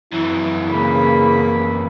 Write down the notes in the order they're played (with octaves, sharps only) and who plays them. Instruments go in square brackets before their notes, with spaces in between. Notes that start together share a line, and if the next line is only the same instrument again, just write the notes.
[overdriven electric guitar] F#2 E3 [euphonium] E4
[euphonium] C#3 [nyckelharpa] A#3 B5